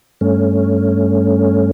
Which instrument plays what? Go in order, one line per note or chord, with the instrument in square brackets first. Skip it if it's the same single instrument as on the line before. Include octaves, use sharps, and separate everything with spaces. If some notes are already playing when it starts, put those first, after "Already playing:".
[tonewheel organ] G2 A3 C#4